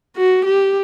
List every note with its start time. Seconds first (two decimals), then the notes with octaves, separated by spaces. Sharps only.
0.16 F#4
0.45 G4